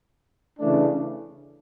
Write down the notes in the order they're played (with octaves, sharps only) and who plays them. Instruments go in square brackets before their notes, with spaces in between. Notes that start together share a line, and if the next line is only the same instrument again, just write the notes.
[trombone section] C#3 E3 A3 D4